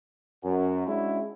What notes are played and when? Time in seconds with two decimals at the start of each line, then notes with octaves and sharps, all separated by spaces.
0.44 F#2
0.88 G#3 C#4 D4 E4 F#4